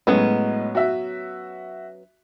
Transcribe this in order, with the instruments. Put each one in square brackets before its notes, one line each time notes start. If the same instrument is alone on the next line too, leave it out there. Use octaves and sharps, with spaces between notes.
[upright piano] A2 G#3 [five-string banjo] F#3 B3 C#4
[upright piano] F#4 E5